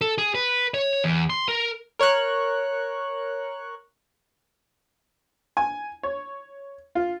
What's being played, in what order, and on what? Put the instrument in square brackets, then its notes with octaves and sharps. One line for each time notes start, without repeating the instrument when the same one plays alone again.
[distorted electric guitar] A4
G#4
B4
C#5
E2
C6
A#4
[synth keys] A#4 C#5 C#6 F#6
[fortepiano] G#5
C#5
F4